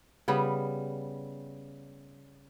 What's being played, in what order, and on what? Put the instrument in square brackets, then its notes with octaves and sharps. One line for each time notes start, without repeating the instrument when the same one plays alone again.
[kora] C#3 G3 B3